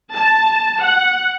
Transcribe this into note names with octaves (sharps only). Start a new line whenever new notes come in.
A5
F#5